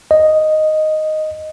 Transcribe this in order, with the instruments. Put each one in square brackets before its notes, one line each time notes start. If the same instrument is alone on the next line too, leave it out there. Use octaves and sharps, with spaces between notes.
[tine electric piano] D#5